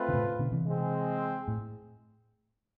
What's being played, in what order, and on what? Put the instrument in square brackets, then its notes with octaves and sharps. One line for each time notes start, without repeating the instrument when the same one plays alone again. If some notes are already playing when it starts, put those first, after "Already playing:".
Already playing: [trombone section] A3 C4 F4 B4
[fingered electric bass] D3
A2 C3
B2 D3
C3 E3
[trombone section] G#3 C4 G#4
[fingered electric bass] A2